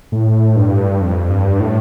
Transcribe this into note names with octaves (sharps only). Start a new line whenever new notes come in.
A2
G2
F2
G2
A2